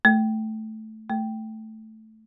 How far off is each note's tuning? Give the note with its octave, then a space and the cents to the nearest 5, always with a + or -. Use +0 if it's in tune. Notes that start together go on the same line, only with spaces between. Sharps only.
A3 -10
A3 -5